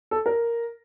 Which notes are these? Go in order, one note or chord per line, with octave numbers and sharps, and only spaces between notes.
A4
A#4